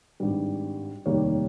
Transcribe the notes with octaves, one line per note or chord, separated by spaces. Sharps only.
G#1 G2 G3
F1 D#2 D#3 G3 A#3 C#5